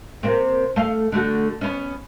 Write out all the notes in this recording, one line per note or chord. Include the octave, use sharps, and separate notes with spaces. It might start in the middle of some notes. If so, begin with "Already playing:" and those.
C3 A#3 C4
A3 F5
D3 A3 F#4
B3 C#4